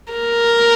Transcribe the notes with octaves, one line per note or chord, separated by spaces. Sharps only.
A#4